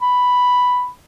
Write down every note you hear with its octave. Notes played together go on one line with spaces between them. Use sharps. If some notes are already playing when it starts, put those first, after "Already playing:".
B5